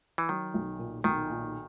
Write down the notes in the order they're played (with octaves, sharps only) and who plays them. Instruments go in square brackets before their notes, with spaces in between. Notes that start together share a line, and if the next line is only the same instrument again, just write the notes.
[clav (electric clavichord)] E3
[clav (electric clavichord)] D#3 [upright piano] F#3
[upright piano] B1
A#2
[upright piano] B1 [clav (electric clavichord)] D#3
[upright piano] A#2